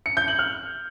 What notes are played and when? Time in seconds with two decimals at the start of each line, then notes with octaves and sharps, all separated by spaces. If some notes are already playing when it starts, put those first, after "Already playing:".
0.06 C#7
0.17 G6
0.28 F#7
0.39 F6